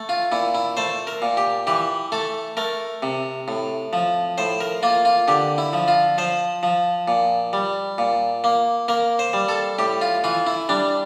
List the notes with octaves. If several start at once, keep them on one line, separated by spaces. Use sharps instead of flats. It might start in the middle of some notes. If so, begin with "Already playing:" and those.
Already playing: A3
F4
A#2 E4
E4
A3 C5
A#4
A#2
G4
E3 G4
A3 A4
A3 A#4
C3
A2
F3
A2 C5
A#4
A#3 F4
F4
D3 G4
E4
F3
F4
F3 C5
F3
A#2
G3
A#2
A#3
A#3 A#4
C5
G3
A4
A2 G4
F4
E3 F4
E4
G3 D4